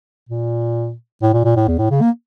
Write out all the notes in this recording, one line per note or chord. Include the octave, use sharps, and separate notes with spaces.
A#2
A2
A#2
A#2
A2
E2
A2
C#3
A#3